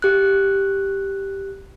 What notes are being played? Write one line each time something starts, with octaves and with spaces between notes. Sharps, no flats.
G4 F#6